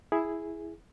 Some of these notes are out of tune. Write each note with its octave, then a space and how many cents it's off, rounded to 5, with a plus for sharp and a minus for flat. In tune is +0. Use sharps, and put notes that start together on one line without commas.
E4 +0 G#4 +0